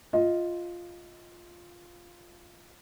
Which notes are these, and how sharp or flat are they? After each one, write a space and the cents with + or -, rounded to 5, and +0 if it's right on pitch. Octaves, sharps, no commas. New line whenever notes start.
F4 +0 D#5 +15